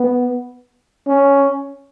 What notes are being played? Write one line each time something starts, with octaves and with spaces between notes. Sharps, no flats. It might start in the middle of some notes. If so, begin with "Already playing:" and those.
Already playing: B3
C#4